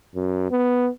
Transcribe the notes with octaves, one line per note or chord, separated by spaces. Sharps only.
F#2
B3